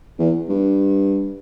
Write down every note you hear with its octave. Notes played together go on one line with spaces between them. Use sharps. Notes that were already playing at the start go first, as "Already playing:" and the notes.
E2
G2